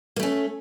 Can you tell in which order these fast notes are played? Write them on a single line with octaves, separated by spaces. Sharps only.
A#3 A3 C#4